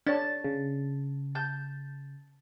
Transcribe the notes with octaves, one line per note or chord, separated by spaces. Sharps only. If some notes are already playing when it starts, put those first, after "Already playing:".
D4 C#5 A5
C#3
A5 G6